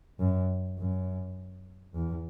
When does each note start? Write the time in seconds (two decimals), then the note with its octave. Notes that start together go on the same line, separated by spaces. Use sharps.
0.20 F#2
0.79 F#2
1.95 E2